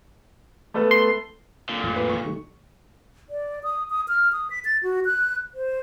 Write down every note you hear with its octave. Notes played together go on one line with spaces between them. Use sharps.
A3 B3 A4
C6
A#2 D3
F2 A2 F3
B4
C#6
D#3 G3 A3
D5
D#6
D#6
F6
D#6
B6
A6
F#4
F#6
C5